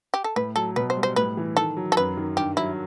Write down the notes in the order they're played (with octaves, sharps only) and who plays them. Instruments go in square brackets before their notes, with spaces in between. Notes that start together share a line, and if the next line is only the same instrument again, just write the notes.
[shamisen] G4
A4
[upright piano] A2 [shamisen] B4
[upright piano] F#3 [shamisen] A4
[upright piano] B2 [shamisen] B4
[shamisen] C5
[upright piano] G3
[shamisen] C5
[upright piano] A2 [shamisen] B4
[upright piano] E3
[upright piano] D#3 [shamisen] A4
[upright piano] F#3
[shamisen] A4
[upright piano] F#2 [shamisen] B4
[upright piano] D#3
[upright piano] G2 [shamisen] G4
[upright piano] F#3 [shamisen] E4